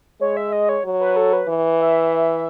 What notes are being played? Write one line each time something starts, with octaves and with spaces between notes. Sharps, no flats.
G#3 C#5
E5
D#5
C#5
F#3
B4
A4
B4
E3
E5